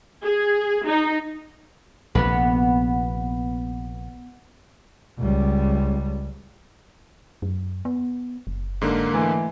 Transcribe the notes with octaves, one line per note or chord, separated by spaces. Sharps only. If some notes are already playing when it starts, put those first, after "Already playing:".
G#4
D#4
A#1 C3 B3
C#2 G3
F#2
B3
F#1
G#2 D3 A#3
E3 A3